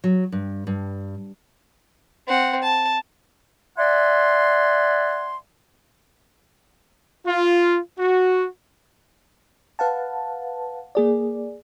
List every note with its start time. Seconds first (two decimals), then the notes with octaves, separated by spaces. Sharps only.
0.04 F#3
0.32 G2
0.67 G2
2.27 C4 F#5
2.62 A5
3.78 D5 E5 F#5 G#5 C6
7.27 F4
7.99 F#4
9.79 B4 F5 F#5 A5
10.95 A#3 G#4 D5